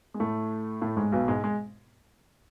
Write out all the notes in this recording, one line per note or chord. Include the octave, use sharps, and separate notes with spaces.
G#3
A2 A3
A2 A3
G#2 G#3
B1 B2
G#2 G#3
G#3